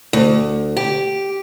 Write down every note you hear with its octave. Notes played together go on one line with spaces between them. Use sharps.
D2
G4